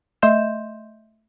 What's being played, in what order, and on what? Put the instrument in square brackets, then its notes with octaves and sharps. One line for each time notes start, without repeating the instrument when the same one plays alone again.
[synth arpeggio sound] A3 D#5 E5 C6 G6 E7